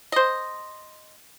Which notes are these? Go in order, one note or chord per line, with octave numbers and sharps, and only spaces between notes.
C5 D#5